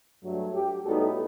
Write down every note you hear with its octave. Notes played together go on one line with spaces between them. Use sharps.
G2 F#3 A3
G4
A2 G3 B3 D#4 F#4 A4